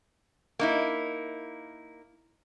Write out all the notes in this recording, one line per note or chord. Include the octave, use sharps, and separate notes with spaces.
A#3 D#4 E4